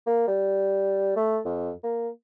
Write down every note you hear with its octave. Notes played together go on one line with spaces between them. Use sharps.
A#3
G3
A3
F2
A#3